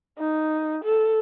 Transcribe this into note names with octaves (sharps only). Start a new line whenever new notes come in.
D#4
A4